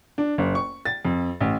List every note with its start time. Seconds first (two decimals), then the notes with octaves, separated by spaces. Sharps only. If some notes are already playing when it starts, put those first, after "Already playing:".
0.18 D4
0.38 F#1
0.55 C#6
0.85 A6
1.05 F2
1.40 A1